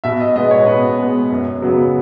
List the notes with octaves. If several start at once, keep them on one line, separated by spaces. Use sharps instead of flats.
B2 E5
D#5
G#3 B3 D#5
C#5
B2 B4
G#3 B3
F#2
C#3 F#3 B3